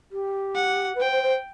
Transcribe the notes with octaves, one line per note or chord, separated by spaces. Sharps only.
G4
F#5
B4
C5 G5
C5
C5